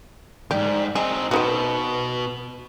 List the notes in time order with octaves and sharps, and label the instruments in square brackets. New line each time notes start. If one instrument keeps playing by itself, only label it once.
[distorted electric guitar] D#2 G#2 [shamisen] G4 [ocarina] D5
[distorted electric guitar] C4 D#4 [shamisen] G#4 [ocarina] D#5
[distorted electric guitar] B2 [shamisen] C4 D#4 F#4 [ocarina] B4